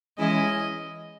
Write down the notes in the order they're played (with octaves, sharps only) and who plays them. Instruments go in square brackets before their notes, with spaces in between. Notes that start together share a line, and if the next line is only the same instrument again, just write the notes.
[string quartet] E3 G#3 C#4 E4 [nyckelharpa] D#5